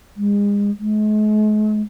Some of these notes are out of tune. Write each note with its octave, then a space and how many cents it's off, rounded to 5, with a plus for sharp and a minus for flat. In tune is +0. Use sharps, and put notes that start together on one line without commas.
G#3 -35
G#3 +40